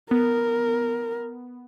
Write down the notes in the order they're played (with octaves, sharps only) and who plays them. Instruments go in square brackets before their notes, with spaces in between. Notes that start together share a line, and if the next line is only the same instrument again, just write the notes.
[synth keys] B3 [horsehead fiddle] A#4